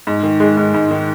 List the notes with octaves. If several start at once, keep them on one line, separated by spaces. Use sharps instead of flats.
G#2
D#3
G#3
G#2
G#2
D#3